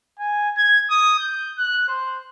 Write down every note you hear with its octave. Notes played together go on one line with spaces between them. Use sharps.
G#5
G#6
D#6
G6
F#6
C5